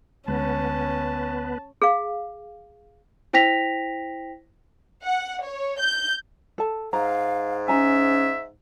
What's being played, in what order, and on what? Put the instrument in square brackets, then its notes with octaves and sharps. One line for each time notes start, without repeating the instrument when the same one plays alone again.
[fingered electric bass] D2 G#3 [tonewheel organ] B3 B4 [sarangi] C#4 [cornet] A5
[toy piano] G#4 F5
[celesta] E4 C5 G5 A#6 B6 F7
[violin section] F#5
C#5
G6
[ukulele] A4 A5
[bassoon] G#2 [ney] F5 [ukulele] A#5
[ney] C#4 [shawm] E5 [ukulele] G#5 A#5